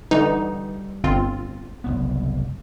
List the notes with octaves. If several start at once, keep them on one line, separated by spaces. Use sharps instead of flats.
D3 E3 G3 D#4
G1 C4 F4
F#1 C2 B3